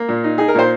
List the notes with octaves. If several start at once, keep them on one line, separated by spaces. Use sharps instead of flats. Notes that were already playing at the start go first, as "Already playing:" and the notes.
Already playing: A#3
A#2
D#4
D#4 G#4
A#4
A#2 C5